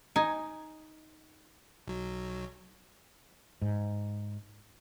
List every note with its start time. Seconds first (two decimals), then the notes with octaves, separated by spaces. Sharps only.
0.16 D#4 G#5
1.87 B1 F#3
3.62 G#2